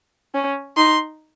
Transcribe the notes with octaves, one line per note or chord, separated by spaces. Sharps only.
C#4
D#4 C6